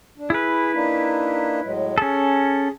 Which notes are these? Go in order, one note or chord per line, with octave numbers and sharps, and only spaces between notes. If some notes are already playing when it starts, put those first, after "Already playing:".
D4
E4 G#4 B4
A#3 D4 D#4
A2 F#3 G#3
C#4 G#4 A4